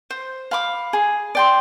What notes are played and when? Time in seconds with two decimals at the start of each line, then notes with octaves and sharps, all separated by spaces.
0.10 C5
0.51 F5 B5 D6
0.93 G#4
1.35 D5 G5 C6